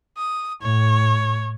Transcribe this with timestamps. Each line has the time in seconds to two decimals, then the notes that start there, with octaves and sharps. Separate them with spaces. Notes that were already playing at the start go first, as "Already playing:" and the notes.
0.18 D#6
0.62 A2 C#5